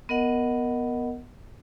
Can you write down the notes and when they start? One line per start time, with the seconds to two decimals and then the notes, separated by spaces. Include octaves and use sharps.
0.09 B3 A#4 D#5 F#5